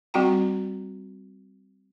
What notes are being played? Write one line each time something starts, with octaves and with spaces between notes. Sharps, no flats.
G3 C4 F#4 G5 A#5